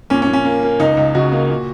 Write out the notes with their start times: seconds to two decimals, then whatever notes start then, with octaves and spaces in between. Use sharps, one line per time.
0.10 A#2 C#4
0.22 C#4
0.28 A#2
0.33 C#4
0.45 A#3
0.63 A#3
0.80 C#2 D#4
0.97 C#2
1.15 C#3 F#4
1.32 A#3
1.50 A#2